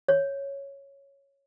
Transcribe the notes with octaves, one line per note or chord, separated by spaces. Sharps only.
C#5